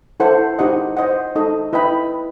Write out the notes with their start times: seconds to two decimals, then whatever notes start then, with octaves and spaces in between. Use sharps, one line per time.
0.20 E4 A4 C5 F#5
0.59 D#4 G4 C5 D#5 F#5
0.97 C5 D#5 F#5
1.36 D#4 A4 D#5
1.73 E4 B4 D#5 G5 B5